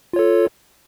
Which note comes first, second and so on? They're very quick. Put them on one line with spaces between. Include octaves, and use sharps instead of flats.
F4 C#5 A4